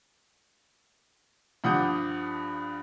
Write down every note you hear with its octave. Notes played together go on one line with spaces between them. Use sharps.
G2 F3 F#5 D6 D#6 G6